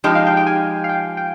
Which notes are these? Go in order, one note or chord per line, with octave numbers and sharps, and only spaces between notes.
F3 G#3 D#4 G4 G5
F5
G5
G5
G#5
F5
G5
G5